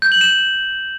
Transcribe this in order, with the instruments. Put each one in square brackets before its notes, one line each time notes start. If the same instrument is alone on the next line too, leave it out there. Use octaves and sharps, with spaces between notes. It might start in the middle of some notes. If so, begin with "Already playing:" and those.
[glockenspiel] G6
F#7
E7